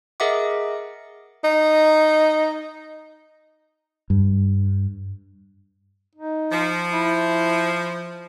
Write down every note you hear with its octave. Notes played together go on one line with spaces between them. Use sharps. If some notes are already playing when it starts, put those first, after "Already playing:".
G#4 A#4 D#5 E5 F#5 D6
D#4
G2
D#4
F3
E4